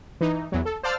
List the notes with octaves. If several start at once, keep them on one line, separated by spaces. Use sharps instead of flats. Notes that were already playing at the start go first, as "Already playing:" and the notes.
E3 D#4
E2 F#3
A4
C5 D5 F5 A5 E6 F6